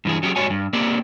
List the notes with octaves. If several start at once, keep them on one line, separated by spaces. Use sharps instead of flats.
G2 E3 G#4
F#3 C#4 G4 G#4
G#2 G3 F#4 C#5 G#5
G2
A#3 C4 G4 D5